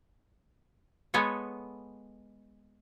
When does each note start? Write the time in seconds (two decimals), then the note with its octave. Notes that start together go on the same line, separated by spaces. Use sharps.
1.14 G#3 B3 A4 C#5